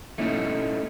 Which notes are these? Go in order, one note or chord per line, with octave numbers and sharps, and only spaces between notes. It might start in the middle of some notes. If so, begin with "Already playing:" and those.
A3 A#3 C#4 D#4 E4 A4